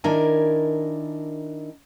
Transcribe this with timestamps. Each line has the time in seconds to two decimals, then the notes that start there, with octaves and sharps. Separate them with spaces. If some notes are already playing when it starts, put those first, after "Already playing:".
0.04 D#3 D4 E4 A#4 G#5